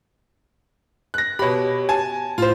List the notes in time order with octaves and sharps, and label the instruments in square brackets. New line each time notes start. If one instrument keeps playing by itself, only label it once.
[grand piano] F#6 A#6
[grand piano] B2 B5 [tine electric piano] G4 C#5
[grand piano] G#5 A5
[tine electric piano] A2 [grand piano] F4 C5